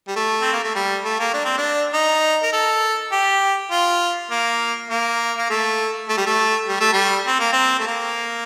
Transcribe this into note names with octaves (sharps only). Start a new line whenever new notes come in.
G3
A3
C4
A#3
A3
G3
A3
A#3
D4
C4
D4
D#4
A#4
A4
G4
F4
A#3
A#3
A#3
A3
A3
G3
A3
G3
A3
G3
C4
A#3
C4
A3
A#3